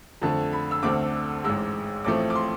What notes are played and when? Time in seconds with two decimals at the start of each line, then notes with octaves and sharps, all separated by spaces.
0.22 F2 D3 A3 C4 A5
0.53 B5
0.71 E6
0.83 D2 D3 A3 C4 D6
1.44 A1 G#2 G#3 E6
2.05 A1 A2 F3 A3 C4 D6
2.30 D6
2.35 C6